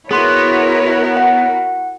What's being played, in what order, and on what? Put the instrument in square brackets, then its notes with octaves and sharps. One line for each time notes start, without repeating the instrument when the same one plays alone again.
[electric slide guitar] B3 [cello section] E4 F#4 A#4 [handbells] G#4 C6 [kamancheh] C#5
[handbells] F#5